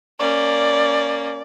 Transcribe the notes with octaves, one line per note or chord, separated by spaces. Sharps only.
A#3 C#4 D5